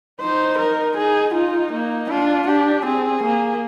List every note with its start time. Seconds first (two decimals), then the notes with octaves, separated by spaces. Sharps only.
0.21 D#4 C5
0.59 A#4
0.97 D#4 G#4
1.35 D#4 F4
1.72 A#3
2.10 D4 F4
2.47 D4 G4
2.85 C4 G#4
3.23 A#3